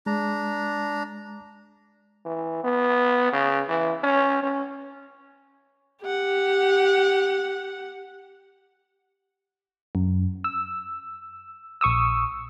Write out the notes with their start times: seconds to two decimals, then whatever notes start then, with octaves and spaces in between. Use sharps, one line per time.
0.06 G#3 D4 A#5
2.25 E3
2.64 B3
3.32 C#3
3.68 E3
4.03 C#4
4.42 C#4
6.02 G4 F#5
9.95 F#2
10.44 E6
11.81 A#1 C#6 D#6 E6